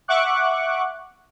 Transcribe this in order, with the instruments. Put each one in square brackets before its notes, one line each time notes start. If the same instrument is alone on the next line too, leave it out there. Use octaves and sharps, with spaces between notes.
[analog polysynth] E5 F#5 C#6 D6 F#6